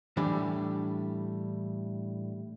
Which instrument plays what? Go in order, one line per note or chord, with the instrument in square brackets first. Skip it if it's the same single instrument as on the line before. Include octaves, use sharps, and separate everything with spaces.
[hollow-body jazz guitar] A2 E3 G3 D4 B5